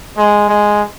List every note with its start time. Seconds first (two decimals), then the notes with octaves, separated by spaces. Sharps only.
0.17 G#3
0.48 G#3